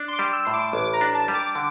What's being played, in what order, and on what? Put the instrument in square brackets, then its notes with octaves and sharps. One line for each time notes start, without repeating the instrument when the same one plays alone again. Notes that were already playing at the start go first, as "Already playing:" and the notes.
Already playing: [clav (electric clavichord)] D4
[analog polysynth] C6
D6
[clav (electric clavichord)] G3
[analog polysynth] E6
[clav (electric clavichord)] A2 [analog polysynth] C6
[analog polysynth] D6
[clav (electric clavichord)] A1 [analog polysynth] D6
[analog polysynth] A#5
[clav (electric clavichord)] D4
[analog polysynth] A5
[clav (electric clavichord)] G3
[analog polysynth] D6
[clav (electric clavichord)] D3 [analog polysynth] D6